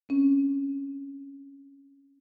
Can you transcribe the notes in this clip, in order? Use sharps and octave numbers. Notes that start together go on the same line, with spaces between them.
C4 C#4